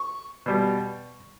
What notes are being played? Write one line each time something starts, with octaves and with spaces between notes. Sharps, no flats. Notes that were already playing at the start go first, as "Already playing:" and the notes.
Already playing: C#6
B2 G3